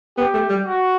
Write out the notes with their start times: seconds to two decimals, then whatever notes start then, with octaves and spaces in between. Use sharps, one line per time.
0.17 B3 G4
0.34 A3
0.49 G3
0.66 F#4